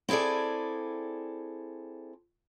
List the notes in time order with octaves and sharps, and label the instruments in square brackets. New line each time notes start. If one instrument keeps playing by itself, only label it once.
[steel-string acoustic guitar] C4 E4 G#4 A4 D5